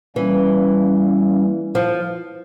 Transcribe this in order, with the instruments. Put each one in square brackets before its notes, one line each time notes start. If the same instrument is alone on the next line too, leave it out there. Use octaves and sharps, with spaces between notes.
[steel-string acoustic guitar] E3 [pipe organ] G3 A#3 C#4
[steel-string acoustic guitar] F3